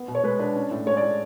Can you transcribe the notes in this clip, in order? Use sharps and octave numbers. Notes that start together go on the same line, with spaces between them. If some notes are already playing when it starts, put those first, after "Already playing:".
Already playing: B3
B2
C#5
G#3 B4
D4 B4
C#4
A2
G#3 C#5
D5
A2